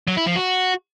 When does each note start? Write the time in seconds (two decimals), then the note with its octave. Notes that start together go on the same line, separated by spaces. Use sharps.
0.08 F#3
0.17 E4
0.26 F3
0.36 F#4